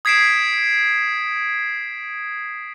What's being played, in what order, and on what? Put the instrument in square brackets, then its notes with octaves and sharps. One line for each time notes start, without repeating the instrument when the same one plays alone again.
[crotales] D#6 G#6 B6 C7 D7 E7